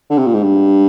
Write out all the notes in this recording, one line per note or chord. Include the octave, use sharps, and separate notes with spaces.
D3
C3
A#2
G#2
G2